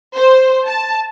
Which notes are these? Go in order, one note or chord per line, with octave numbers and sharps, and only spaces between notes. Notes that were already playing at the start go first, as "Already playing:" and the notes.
C5
A5